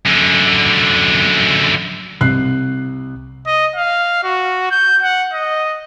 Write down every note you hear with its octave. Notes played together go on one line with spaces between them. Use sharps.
F#2 D3
C2 F#6 C7
D#5
F5
F#4
G6
F#5
D#5